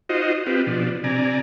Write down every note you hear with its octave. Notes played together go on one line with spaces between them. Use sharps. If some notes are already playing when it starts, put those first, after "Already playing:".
D#4 F4 F#4 C5 D#5
C4 F4 G4 B4
B2 F3 D4
C3 D5 G#5 A#5